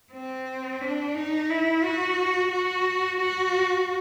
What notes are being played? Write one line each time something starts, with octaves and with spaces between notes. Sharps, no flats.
C4
D4
D#4
E4
F#4
F#4
F#4